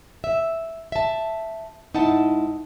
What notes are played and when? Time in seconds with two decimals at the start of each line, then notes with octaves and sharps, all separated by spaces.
0.24 E5
0.92 E5 A5
1.94 G#2 D#4 E4 F#5 A5